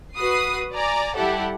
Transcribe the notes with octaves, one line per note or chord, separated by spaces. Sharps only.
F#4 B4 D#6 C7
D5 G#5 A#5
G3 E4 G4 A4 F#5